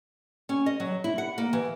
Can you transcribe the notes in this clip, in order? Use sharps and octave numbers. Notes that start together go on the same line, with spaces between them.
C#4
D#5
F#3
E4
F#5
A#3
E3